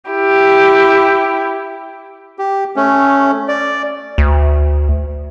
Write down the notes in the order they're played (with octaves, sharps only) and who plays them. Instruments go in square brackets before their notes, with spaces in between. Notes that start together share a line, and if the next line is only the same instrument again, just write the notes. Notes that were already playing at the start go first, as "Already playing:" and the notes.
[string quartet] E4 G4
[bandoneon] G4
A3 C#4
D5
[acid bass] D2